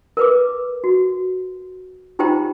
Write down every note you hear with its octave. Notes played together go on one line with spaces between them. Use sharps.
A#4 B4 D6
F#4
D#4 F4 G4 C5 G5 A#5